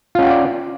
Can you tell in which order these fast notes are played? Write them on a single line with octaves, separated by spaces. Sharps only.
F4 C#4 F#5 G5 D5